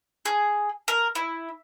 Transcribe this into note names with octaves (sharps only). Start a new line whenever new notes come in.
G#4
A#4
E4